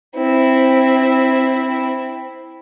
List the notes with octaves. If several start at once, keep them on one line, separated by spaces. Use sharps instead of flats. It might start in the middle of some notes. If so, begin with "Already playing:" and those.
C4 E4